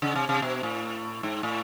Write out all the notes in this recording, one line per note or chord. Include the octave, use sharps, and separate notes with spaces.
C#3
C3
C3
B2
A2
G#2
A2